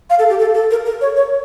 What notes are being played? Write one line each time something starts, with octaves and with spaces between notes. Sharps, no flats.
F5
A4
G4
A4
A4
A#4
A#4
C#5
C#5